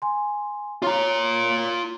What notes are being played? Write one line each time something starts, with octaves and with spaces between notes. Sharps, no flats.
G#5 C6
F4 C#5 A#5